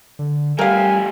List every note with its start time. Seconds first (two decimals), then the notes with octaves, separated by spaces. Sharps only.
0.19 D3
0.59 G3 A3 G4 A#4 F5 G#5